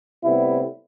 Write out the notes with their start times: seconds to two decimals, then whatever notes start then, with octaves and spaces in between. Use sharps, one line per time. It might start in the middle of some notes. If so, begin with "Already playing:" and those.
0.25 A2 C3 G3 B3 E4